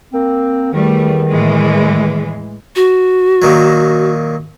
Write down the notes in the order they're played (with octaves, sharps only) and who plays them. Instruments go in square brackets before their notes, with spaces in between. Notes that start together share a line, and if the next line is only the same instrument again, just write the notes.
[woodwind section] A#3 C4
[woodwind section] E2 D#3 [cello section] G3 A3
[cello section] A2 E3 G#3
[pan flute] F#4
[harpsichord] A#2 D#3 F#3